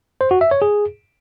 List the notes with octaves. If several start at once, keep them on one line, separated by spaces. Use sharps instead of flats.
C5
F#4
E5
C#5
G#4